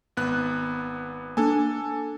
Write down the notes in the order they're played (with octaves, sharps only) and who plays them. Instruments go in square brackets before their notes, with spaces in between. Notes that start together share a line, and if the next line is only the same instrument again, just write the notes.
[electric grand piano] G#1 B3 F#6
[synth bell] A#3 D4 [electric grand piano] A4 G#5